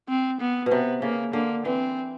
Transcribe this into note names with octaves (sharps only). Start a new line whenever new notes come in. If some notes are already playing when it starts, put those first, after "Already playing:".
C4
B3
B2
C3 B3
C#3 A#3
D3 A#3
E3 C4